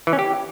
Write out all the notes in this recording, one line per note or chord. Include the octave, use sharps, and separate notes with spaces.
E3
C#4
G4